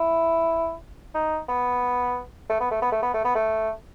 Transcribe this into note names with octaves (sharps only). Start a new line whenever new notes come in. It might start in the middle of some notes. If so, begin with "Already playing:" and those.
Already playing: E4
D#4
B3
A3
B3
A3
B3
A3
B3
A3
B3
A3